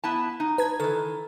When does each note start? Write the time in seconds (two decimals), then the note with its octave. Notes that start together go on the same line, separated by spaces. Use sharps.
0.04 B3 E4 A5
0.40 D#4
0.58 B4 A5 G#6
0.80 D#3 E3 A4